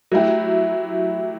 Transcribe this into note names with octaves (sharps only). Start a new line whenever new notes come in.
F#3 A3 E4 G4